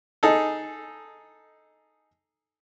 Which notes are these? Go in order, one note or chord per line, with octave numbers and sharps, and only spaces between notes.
D#4 G#4 A4